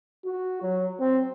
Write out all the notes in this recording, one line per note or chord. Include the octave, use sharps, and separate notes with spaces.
F#4
F#3
C4